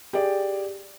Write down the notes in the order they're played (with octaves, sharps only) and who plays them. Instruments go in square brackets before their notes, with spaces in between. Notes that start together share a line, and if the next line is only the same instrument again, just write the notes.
[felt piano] G4 G#4 D5